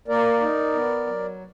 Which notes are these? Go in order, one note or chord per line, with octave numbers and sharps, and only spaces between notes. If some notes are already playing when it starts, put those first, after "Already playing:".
A#3 A#4 D5
D#4
B3
F#3